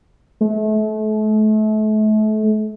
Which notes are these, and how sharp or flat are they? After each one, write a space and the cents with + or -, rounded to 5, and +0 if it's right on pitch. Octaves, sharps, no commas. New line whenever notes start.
A3 -35